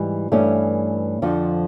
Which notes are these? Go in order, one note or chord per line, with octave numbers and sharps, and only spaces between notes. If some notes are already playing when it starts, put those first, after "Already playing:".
Already playing: G#2 E3 G3
G2 E3 A3 C#4
F2 D3 F3